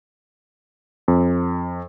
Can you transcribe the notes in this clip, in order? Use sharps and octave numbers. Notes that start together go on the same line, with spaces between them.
F2